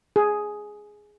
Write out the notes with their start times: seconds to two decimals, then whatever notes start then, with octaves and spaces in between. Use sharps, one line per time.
0.16 G#4